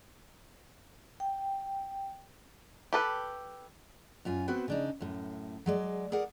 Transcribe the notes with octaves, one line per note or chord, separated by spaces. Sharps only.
G5
G4 A4 B4
F#2 F4 G#5
B3 C4 F#4 B4 C5 G5
C#3 D4 D#4
F#2 A2
F#3 G#3 D5
G#4 A#4 D5 F#5